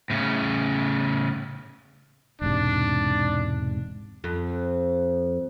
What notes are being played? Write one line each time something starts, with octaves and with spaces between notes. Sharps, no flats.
A2 C#3
E1 G#2 C3 D4
F2